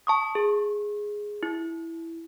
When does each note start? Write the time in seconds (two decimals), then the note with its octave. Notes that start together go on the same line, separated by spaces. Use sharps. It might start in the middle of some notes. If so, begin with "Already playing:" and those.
0.07 A5 C#6 D#6
0.35 G#4
1.43 E4